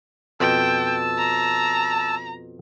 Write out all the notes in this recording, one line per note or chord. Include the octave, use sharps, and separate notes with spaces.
F2 B2 G5 A5 E6
A#5